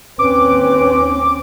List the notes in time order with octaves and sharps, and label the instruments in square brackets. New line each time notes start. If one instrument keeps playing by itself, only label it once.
[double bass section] D#2 C4 C#4 [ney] B4 [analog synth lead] D6